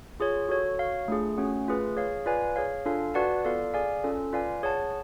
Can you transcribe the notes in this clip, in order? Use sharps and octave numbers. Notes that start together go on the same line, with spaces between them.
F4 G#4 C#5
F#4 A4 C#5
F#4 C#5 F5
A3 D4 F4 G#4
A3 C#4 F#4 C#5 F#5
A3 F4 G#4 B4
G#4 C#5 F5
F4 B4 D5 F5 G#5
G#4 C#5 F5
D4 F4 A4 F5 G#5
F#4 B4 D5 F#5 A5
B3 F4 A4 D5 F5
G#4 D5 F5 G#5
C#4 F4 A4
F4 B4 D5 F5 G#5
G#4 C#5 F#5 A5